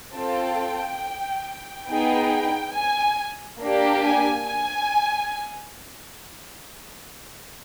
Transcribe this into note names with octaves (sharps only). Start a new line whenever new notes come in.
C4 F4 A4 G5
B3 D#4 G#4 G5
G#5
A#3 D4 G4
G#5
G#5